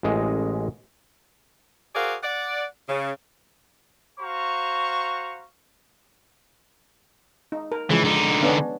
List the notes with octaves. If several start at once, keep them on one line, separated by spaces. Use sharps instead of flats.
A1 G#3 D#5
F#4 G#4 A#4 C5 D5 F5
D5 F#5
C#3
F#4 C5 F5 A#5 C#6
D#4
A#4
C#3 E3 F3 G#3
D3 D#4
B3 C#4 D4